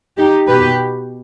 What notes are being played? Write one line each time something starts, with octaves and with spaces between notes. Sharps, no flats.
D#4 G4
B2 G4 B4